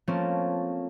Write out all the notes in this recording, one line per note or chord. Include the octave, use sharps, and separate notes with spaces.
F3 A3 A#3 C4 C#4